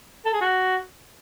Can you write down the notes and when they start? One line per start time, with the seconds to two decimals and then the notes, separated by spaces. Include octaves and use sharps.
0.26 A4
0.33 G#4
0.41 F#4